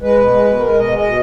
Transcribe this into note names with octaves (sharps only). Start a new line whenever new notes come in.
G#3 B4
B2
G#3
B2
G#3 A#4
B2
D#5
G#3
D#5
B2